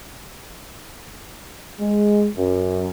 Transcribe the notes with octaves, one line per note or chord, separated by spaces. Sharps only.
G#3
F#2